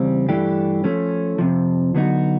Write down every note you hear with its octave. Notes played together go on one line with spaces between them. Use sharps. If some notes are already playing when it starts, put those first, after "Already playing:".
Already playing: E2 C#3 G3 C4
G2 E3 A3 D4 G4
F3 A3 C#4
F2 C3 F3
D3 F#3 B3 D#4 F#4